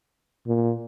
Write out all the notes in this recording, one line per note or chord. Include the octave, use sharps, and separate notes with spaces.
A#2